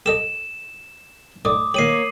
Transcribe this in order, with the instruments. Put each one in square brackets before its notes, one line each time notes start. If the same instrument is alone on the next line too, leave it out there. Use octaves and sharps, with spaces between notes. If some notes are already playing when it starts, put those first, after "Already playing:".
[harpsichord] G4 A4 D#5 [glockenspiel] E7
[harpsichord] A2 D#4 D5 [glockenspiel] D6 D#6
[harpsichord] D#3 G4 [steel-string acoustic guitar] A#3 C#5 [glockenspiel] C7 D#7 F#7